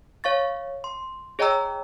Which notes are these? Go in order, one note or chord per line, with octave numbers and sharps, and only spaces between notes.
C#5 F5 C#6 A6
C6
G#4 C#5 D#5 G5 A#5 E6